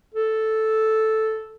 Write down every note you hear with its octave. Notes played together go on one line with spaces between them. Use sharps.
A4